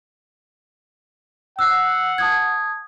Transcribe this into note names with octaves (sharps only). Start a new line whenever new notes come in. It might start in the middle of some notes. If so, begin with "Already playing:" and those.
F#5 E6 F#6 C7
A5 D#6 G#6